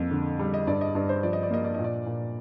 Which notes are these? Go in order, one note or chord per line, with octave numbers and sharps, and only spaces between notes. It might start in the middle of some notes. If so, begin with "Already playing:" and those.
Already playing: F2 A#3
D3
G3
D#5
G2 D5
D#5
G2 D5
C5
F3 D5
D#5
D5
A#3 D#5
D5
A#2 D#5
D5
A#2